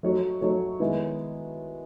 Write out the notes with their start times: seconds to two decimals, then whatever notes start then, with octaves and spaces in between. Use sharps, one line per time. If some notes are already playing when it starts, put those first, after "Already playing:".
0.03 F#3 A3 D#4 F#4 C#5
0.41 F#3 A3 D#4 F#4 C#5
0.79 D#3 G#3 B3 E4